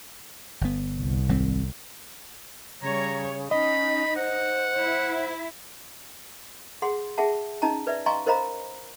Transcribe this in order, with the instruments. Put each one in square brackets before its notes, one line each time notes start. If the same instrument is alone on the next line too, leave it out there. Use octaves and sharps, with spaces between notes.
[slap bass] G1 B3
[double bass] C2
[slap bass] G#1 G3 C4
[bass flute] C#3 [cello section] G3 C#5 [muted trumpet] A#5
[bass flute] C#4 [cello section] D#4 [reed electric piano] D#5 [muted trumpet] B5
[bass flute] C5 [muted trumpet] F#5
[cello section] E4
[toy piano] G#4 F#5 C6
G#4 E5 F#5 A5
C#4 D#4 D#5 A5 A#5
B4 D5 E5
D#5 F5 G#5 A#5 C6 C#6
A#4 C5 D#5 F5 A#5 B5